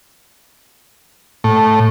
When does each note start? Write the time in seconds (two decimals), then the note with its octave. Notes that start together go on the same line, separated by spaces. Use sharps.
1.44 A2